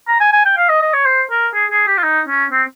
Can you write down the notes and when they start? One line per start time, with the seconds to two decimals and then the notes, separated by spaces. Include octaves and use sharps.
0.08 A#5
0.20 G#5
0.33 G#5
0.45 G5
0.57 F5
0.69 D#5
0.81 D#5
0.93 C#5
1.05 C5
1.31 A#4
1.54 G#4
1.71 G#4
1.87 G4
1.97 F4
2.03 D#4
2.28 C#4
2.52 C4